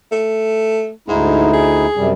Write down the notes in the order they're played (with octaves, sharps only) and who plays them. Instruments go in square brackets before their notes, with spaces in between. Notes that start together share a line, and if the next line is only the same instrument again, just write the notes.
[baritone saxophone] A3
[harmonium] D2 D#4 E4 [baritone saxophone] G#2
[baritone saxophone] G#4
[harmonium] F#2 C3 G3